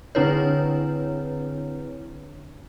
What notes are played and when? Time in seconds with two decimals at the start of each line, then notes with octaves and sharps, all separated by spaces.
0.15 D3 C4 D4 E4 B4 C#5